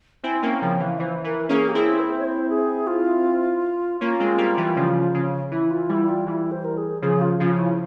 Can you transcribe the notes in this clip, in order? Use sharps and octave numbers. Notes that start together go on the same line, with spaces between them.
C4 E4 G#5
A#3 C#4 G5
C#3 F3 G5
E3 F5
E3 C5
E3 A#4
A#3 C#4 G#4
G4
C4 E4 G#4
C5
C#5
C5
G#4
F4
A#3 C#4 F4
G#3 C4
G3 A#3
E3 G3
C#3 F3
C#3
E3 E4
F4
E3 G3 E4
F4
E3 G3 E4
C5
A#4
G#4
C#3 F3 G#4
F4
C#3 F3 F4
F4
E4